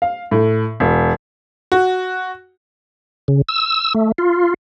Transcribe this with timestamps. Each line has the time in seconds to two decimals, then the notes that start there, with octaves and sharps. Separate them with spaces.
0.02 F5
0.31 A2
0.80 E1
1.72 F#4
3.28 C#3
3.49 E6
3.94 A3
4.18 F4